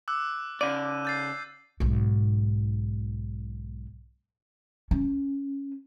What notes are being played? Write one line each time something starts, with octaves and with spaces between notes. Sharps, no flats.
D6 E6 F#6
C#3 D5 D#7
G6 A6 C7
B1 G#2
C#4